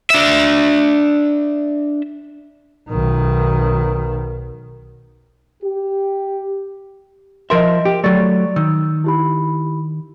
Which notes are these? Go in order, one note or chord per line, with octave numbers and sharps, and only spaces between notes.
D4 E5
B1 D#3
G4
F3 A#4 D#5 E5 C6
G4
F#3 A3 D5 C#6 A6
D#3 E6
E4 G4 B5